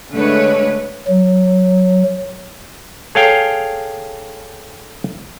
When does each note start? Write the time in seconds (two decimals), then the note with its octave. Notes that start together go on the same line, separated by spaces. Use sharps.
0.12 D3 G#3 A3 D4 B4 C#5
1.08 F#3
3.15 G#4 A4 C#5 F5 G5